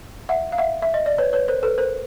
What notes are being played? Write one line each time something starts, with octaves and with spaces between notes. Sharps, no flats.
E5 F#5
F5
E5 F#5
E5
D#5
D5
B4 C#5
B4 C#5
A#4 C5
A4 B4
A#4 C5